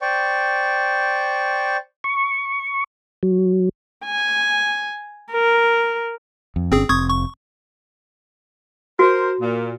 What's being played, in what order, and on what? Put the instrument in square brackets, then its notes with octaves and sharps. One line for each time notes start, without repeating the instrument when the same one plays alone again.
[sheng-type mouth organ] C5 D5 G5 C#6
[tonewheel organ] C#6
F#3
[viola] G#5
A#4
[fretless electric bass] F2
[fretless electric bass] G1 C#4 [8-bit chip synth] C4 G#4
[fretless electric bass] F1 C4 [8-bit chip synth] C#6 D#6 G#6
[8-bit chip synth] C#6
[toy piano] F#4 [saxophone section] A#4 C5
[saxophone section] A#2